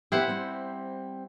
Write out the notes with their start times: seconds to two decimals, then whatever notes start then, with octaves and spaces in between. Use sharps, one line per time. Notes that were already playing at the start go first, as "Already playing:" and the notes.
0.12 B3 E4 G4 C5 F#5
0.28 G3 C4